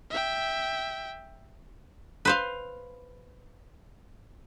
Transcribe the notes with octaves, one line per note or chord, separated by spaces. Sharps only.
E5 G5
B4 C5 F5